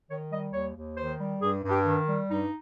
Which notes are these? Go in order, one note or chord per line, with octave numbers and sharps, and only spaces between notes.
D#3 C#5
G3 D#5
D#2 C#5
D#2
D#3 C5
G3
G2 G#4
G2
G4
D#3
G3
G2 D#4